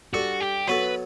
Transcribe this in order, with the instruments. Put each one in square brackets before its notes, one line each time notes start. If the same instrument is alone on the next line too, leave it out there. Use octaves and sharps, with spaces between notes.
[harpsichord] G3 D4 A4 [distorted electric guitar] F#4
[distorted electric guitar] G4
[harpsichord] F#3 B3 F#4 A4 [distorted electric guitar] B4